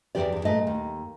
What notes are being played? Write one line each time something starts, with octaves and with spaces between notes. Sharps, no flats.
E2 B2 E3 G4 D5
E2 E3
A#2 A3 D#5
D#2